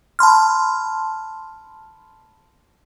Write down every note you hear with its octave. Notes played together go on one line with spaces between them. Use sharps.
A5 B5 C6 F6